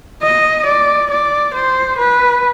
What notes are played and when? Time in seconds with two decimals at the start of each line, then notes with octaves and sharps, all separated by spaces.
0.22 D#5
0.66 D5
1.11 D5
1.54 C5
1.98 B4